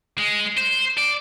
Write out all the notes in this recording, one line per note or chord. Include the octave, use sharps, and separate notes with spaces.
G#3
C5
D5